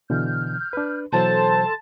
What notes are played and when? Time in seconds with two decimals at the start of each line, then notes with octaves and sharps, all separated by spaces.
0.10 B2 D3 E3 F6 G6
0.73 D4 B4
1.13 B2 E3 F#3 A4 C5 A5 C6